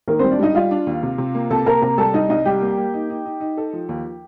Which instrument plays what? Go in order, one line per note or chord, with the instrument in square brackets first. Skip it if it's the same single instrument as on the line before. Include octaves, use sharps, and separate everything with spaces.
[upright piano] D#3 [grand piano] A#3 A#4
[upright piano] G3 [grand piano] C4 C5
[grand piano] D4 D5
[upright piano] G3 [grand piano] D#4 D#5
[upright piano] G3 [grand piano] F4 F5
[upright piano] D4
D#2
C3
C3
A#3
[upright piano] C3 [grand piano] A4 A5
[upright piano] A#3 [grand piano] A#4 A#5
[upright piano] C3 [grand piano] A#4 A#5
[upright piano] G3 [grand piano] A4 A5
[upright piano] C2 [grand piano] D#4 D#5
[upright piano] C2 [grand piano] D#4 D#5
[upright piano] G3 [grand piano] G4 G5
[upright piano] A#3
A#3
D#4
D#4
D#4
D#4
A4
F3
D#2